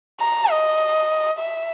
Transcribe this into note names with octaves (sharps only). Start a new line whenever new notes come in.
A#5
D#5
E5